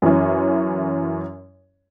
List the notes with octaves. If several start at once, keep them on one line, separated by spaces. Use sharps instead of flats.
F#2 E3 C#4